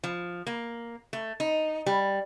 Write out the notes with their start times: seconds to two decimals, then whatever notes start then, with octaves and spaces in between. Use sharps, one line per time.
0.04 F3
0.47 A#3
1.13 A3
1.40 D#4
1.86 G3